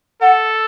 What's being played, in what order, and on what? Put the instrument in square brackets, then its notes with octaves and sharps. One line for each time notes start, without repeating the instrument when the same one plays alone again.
[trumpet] A4 [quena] F#5